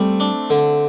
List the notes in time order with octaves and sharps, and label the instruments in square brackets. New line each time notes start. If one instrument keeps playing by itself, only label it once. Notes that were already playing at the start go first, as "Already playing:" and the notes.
Already playing: [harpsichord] G3 [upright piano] A3 C4
[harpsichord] D4
D3